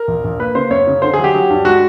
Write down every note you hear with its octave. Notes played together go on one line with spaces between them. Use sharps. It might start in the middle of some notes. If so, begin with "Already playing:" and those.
Already playing: A#4
A#1
A#1
A#3 B4
C#3 C5
F#2 C#5
C#3
D3 C5
F#3 G#4
G4
F#3
G2
G#3 F#4